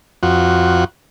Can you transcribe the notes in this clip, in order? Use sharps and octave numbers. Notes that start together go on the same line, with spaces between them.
F2 F#4